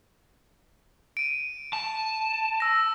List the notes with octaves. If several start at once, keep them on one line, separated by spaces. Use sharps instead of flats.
D7 D#7
A5
E6 A#6